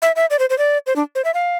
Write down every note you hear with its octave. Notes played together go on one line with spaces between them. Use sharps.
E5
E5
D5
C5
C5
D5
C5
D4
C5
E5
F5